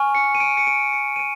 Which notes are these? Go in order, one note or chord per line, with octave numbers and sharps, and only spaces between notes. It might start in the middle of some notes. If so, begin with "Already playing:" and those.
Already playing: G#5 C#6 F6
C#7
D#7
D7
C#7
D7
C#7
D#7
D7